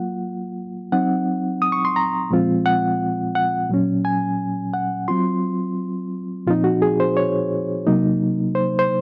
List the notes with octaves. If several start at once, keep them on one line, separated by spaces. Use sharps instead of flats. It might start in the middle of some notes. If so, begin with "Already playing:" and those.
Already playing: F#3 A#3 F4 F#5
F#3 C4 D#4 F#5
D#6
C#6
C6
A#5
A#2 F3 G#3 C4 F4
F#5
F#5
A#2 F#3 C#4
G#5
F#5
F#3 C4 F4 C6
A#2 F3 C4 D#4 F4
F#4
G#4
C5
C#5
C3 F#3 A#3 D#4
C5
C5